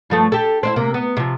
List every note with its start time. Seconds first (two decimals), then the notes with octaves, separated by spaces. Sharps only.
0.10 G2 F3 A3
0.32 G4 A4
0.63 C4 D4 E4
0.76 C3 A#3
0.94 B3
1.17 C3 F3